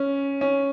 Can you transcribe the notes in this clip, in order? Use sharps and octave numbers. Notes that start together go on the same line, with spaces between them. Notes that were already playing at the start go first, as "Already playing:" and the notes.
Already playing: C#4
C#4